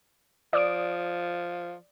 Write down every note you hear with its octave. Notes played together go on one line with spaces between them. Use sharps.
F3 D5 D#6 D7